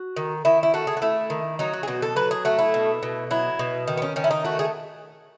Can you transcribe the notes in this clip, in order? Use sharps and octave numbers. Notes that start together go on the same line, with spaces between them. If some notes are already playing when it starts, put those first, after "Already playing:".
Already playing: F#4
D#3
D#3 E4
E4
A3 F#4
G#4
F#4
A3 E4
D#3
F#3 D#4
F#4
G#4
B2 F#4
A4
F#3 B4
G#4
A3 F#4
E4
B2
B2
F#3 E4
B2
D#3
B3
C#4
D#3 C#4
E4
D#4
A3 F#4
G#4